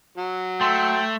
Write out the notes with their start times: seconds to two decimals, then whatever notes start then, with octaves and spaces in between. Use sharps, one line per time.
0.17 F#3
0.61 A3 G5 C6 E6